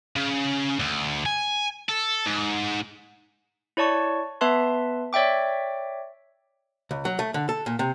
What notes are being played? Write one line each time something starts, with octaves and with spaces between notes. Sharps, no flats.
C#3
D2
G#5
A4
G#2
E4 C#5 D5 A5 C#6
B3 B4 E5 A5 C6
C#5 D5 E5 G5 D6
C#2
F#3
A3
D3
A4
A#2
C3